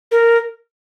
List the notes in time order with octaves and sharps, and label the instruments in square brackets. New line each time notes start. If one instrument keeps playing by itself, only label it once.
[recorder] A#4